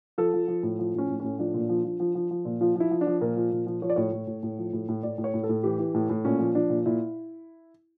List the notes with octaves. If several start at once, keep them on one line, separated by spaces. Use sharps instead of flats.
F3 A4
F3
F3
A2
F3
A2 C#4
A2
A2 C#4
F3 D4
A#2
F3
F3
F3
F3
F3
A#2
F3 F4
F3 E4
F3
D4
F3
A#2 A#4
F3
A#2
F3
F3 C#5
D5
A2 C#5
A2
A2
A2
F3
A2
A2
A2 D5
A2
C#5
A2
A4
A2
E3 G4
E3
A2
A2
A#2 C#4
F3
F3 D4
A#2
A#2 E4